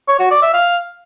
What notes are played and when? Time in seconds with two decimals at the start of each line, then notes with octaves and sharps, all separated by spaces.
0.08 C#5
0.20 F#4
0.31 D5
0.42 E5
0.54 F5